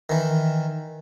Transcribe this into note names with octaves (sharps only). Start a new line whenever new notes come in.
D#3 E3